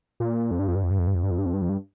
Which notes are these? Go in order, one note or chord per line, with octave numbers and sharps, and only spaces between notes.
A#2
F2
G2
F2
G2
F2
G2
F2
G2
F2
G2
F2
G2
F2
G2
F2
G2